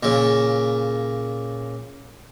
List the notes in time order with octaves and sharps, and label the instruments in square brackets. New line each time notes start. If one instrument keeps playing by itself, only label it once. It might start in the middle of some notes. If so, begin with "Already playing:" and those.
[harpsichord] A#2 C#3